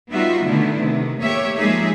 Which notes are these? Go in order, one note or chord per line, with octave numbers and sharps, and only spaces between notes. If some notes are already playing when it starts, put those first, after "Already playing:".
G3 B3 D#4 F4 F#4 E5
B2 D3 D#3 A3 B3 E4
C3 D#3
A3 A#3 G4 C#5 E5
F3 G#3 A#3 D#4 G#4 E5